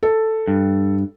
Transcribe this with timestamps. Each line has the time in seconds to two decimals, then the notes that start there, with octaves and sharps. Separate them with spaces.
0.03 A4
0.48 G2